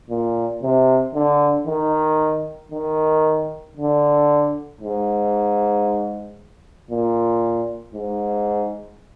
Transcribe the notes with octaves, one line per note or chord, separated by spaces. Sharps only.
A#2
C3
D3
D#3
D#3
D3
G#2
A#2
G#2